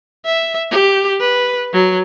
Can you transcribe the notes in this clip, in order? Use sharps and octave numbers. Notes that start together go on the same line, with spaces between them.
E5
G4
B4
F#3